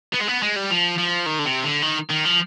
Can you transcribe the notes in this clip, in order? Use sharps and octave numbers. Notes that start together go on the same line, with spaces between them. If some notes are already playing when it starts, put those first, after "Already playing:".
B3
G#3
B3
G#3
G3
F3
F3
D#3
D3
C3
D3
D#3
D#3
F3